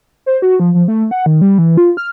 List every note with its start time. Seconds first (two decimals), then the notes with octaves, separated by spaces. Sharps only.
0.26 C5
0.42 F#4
0.60 F3
0.74 F3
0.88 A3
1.11 F#5
1.26 D#3
1.41 G3
1.58 E3
1.77 F4
1.97 F6